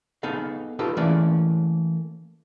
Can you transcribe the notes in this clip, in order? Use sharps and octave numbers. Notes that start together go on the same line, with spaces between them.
B3 D#4 G#4 A4 F5
D#4 F4 G4 A4 B4
E3 A3 A#3 C#4 G#4 D5